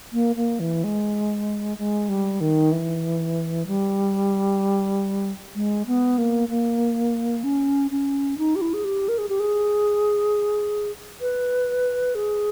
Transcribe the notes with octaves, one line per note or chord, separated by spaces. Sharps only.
A#3
A#3
E3
G#3
G#3
G3
D#3
E3
G3
G#3
B3
A#3
A#3
C#4
C#4
D#4
G4
E4
G#4
G4
A#4
G#4
G4
G#4
B4
G#4